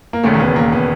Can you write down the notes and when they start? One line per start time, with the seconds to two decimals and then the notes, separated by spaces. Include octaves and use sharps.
0.13 A#3
0.23 E1 D#2 C#3 A3
0.34 A#3
0.40 B3
0.56 A#3
0.72 B3